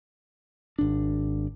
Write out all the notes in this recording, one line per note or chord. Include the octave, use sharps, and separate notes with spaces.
G#1 D4